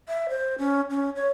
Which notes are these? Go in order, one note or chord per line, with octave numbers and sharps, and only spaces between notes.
E5
C5
C#4
C#4
C#5